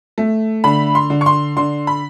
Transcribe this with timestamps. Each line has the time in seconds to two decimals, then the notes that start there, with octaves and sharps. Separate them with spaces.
0.18 A3
0.64 D3 B5
0.95 C6
1.10 D3
1.21 C#6
1.26 C6
1.57 D3 C6
1.87 B5